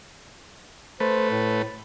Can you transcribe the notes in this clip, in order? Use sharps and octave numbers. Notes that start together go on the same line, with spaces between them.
A3 B4 C5
A2